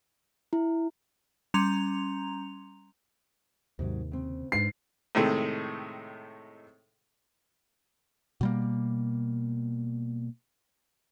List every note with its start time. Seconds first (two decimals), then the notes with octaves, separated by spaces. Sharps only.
0.53 E4
1.54 G3 C#4 A#5 C6 F7
3.79 D#2 G#2 C3 D#3 F#3
4.12 C#3 C4
4.52 G#2 D4 B4 C7
5.15 A2 C3 D#3 G#3 A3
8.41 B2 G3 A#3